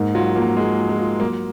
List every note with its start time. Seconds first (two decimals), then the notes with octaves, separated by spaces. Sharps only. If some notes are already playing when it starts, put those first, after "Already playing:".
Already playing: G#2 A#3
0.14 F#3 F4
0.36 F3 A#3
0.56 G#3 A#3
0.78 F3
0.89 G#3
0.99 F4
1.20 F#3 A#3